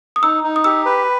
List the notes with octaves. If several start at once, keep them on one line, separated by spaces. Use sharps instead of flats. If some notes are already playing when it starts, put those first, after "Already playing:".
D#6
D#4 E6
D#4
D#6
G4 E6
B4